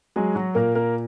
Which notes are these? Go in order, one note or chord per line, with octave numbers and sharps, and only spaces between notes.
F#3 G#3 G#4
F#3 F#4
A#2 A#3 A#4
A#3 A#4